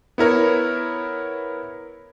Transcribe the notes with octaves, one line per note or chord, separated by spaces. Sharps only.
B3 E4 A#4 C#5